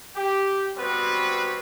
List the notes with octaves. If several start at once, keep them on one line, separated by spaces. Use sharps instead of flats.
G4
G3 B3 C4 F#4 B4